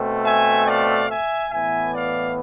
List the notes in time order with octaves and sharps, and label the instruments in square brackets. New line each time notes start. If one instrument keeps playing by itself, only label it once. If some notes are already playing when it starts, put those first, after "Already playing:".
Already playing: [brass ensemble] B2 A3 C4
E5 G#5
D5 F5
E5 G#5
A2 E3 B3 E5 G#5
D5 F5